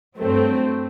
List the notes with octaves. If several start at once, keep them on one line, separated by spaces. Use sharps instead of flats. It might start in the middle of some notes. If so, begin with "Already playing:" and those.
G2 F#3 A3 C4